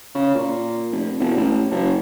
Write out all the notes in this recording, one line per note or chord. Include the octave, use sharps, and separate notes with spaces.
C#3
A#2
F1
E1
A1
F#1